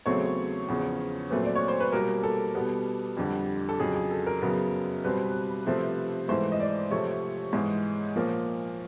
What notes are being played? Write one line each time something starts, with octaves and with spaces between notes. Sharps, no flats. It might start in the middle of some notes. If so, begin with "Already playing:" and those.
E2 C#3 F#3 A3 C4 C#5
E2 C#3 F3
A#2 F#3 A3 C4 B4
D5
C#5
C5
B4
B2 G3 A#3 A#4
A4
B2 G3 B3
F2 D3 G3
A4
F2 C#3 F#3 G#4
G#4
A4
A#4
F#2 C#3 F#3 B3
B2 G3 C4 B4
C3 F3 A3 C4
G#2 E3 A3 C5
D#5
D5
C3 F3 A3 C#5
G#2 E3 G#3
A#2 F3 A#3